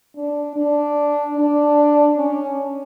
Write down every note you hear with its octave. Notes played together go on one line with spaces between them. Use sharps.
D4
D4
D4
C#4